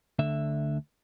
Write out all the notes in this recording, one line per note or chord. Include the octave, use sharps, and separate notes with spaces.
D2 D3 E5